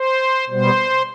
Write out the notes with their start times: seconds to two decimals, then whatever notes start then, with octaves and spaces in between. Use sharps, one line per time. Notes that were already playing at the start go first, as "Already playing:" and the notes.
Already playing: C5
0.50 B2 G3 B3 C5